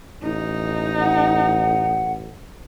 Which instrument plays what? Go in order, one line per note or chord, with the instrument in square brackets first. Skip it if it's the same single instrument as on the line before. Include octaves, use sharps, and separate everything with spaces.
[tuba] A1 [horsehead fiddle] D#4
[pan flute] F#5